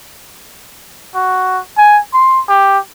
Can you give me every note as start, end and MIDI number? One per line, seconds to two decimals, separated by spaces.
1.15 1.59 66
1.78 1.99 80
2.13 2.40 84
2.49 2.79 67